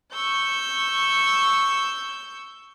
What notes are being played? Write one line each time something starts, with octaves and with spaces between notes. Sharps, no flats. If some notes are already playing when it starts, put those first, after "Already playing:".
C#6 E6 G6